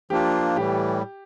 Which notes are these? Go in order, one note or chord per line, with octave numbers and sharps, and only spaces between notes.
F3 A#3 D4 F4 G4
A2 E3 G3 G4